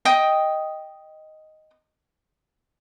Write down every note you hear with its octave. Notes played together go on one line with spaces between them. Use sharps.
D#5 G5 D#6